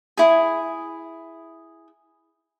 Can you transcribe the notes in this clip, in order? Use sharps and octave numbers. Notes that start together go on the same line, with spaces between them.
E4 G#4